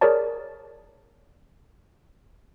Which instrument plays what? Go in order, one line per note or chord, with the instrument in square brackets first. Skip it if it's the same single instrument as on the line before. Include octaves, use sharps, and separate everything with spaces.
[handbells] G#4 A#4 C#5 D5 A5